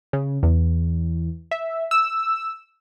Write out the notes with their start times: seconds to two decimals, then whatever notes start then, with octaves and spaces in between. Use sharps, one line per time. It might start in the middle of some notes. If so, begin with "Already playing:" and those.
0.13 C#3
0.43 E2
1.51 E5
1.91 E6